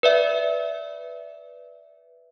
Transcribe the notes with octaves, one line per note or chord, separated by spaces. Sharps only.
B4 D5 E5